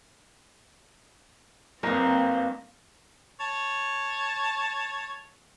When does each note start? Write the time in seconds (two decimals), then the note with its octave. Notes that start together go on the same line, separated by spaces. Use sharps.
1.83 F#1 G2 A#3 C4 D#5 A#5
3.41 C#5 A5